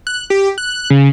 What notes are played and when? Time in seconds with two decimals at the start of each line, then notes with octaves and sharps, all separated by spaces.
0.07 F#6
0.30 G4
0.58 F#6
0.90 C#3